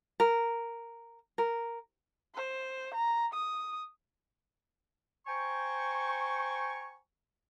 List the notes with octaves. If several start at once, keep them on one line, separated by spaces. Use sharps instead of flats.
A#4
A#4
C5
A#5
D#6
C5 G5 G#5 A#5 C#6